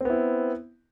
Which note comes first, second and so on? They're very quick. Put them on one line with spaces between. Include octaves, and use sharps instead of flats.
C4 B3 E4